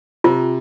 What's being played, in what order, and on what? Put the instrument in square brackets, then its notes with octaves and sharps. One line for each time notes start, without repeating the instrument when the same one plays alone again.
[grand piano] C3 [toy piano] F4